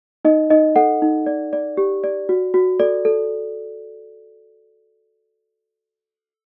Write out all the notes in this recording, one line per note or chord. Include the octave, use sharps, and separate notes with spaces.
D#4 D#5
D#4 D#5
A4 F#5
D#4
D5
D5
G4
D5
F#4
F#4
A4 D5
A4